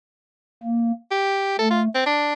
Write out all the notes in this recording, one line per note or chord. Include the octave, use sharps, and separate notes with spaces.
A#3
G4
A3 A4
F4
C4
D4